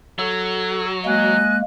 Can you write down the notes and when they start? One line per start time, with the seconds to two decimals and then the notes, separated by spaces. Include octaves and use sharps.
0.19 F#3 A4
1.05 G#3 A#3 D#5 G#5 F#6